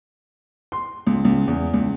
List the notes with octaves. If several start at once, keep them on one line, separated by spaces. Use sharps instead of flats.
C6
C#2
C#2
E2
C#2